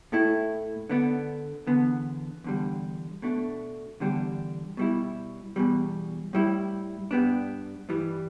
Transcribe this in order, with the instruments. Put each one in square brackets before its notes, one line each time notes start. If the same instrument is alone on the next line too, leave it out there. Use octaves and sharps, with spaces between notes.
[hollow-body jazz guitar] A2 A3 E4
D3 B3 D4
E2 D3 B3
E2 D3 G3
B2 A3 D4
E2 D3 G3 D4
B2 G3 E4
E2 B2 G3
A2 G3 E4
G2 G3 B3 D4
G2 E3 G3